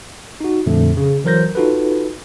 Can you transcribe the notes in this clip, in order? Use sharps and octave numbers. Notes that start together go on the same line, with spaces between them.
D#4 F#4
F2 A#2 D3 F3 A3
C#3
E3 F#3 A#4 C5 G6 A#6
D#4 F4 F#4 A4 B4